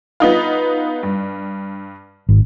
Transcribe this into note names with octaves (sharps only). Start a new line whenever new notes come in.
B3 D#4 F4
G2
G#1